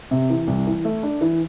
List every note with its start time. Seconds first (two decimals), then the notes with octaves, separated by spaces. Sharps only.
0.11 C3
0.30 E3
0.47 C2
0.67 E3
0.85 A3
1.03 D4
1.21 E3